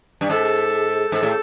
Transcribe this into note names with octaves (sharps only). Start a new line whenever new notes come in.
G2
G#2 A4
G#2 A4
A2